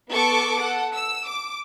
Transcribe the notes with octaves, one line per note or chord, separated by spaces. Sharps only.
B3 A4 C#6 D6
A4 F#5
E6
D6